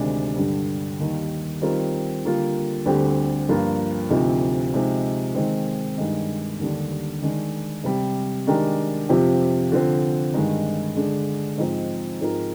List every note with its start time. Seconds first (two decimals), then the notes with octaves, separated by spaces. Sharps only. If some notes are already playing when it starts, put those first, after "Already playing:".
Already playing: D2 C3 D#3 G#3 D4
0.36 G2 D3 G3 D4
0.99 D#2 D#3 G3
1.62 D#3 G3 C4 F4 A#4
2.24 D3 G3 A#3 F4
2.85 D2 D3 G3 C4 G4
3.49 G2 F3 A#3 F4
4.10 D2 C3 F3 C4 D#4
4.73 C3 F3 G#3 D#4
5.35 D#3 G#3 C4
5.98 G2 D#3 G#3
6.59 D#2 D3 G3 D4
7.22 D#3 G#3 D4
7.84 C3 G3 C4
8.47 D#3 G#3 D4 G4 A#4
9.09 F2 C3 F3 C4 G4
9.72 D3 F3 C4
10.34 G2 D#3 G#3 D#4
10.96 D3 G#3 D4 G#4
11.58 G#2 F3 C4 D#4
12.21 G#2 F3 C4 F4 A#4